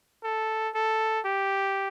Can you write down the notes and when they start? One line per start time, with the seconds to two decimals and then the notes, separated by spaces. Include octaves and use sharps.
0.24 A4
0.75 A4
1.26 G4